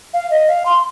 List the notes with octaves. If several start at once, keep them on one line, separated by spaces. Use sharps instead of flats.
F5
D#5
F5
C6